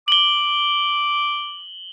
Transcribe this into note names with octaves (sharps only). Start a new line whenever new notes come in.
D6 F#7 G7